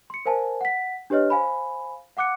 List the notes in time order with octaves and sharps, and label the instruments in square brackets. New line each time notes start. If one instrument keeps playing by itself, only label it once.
[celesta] C6 C#7
A#4 C5 F5 G#5 A5
F#5 B6
D4 G4 B4 C#5 D#5 F6
C5 F5 G#5 B5
F5 F#5 D6 F#6 C#7